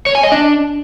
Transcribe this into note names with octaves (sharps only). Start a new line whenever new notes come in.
C#5
G#5
D#5
D4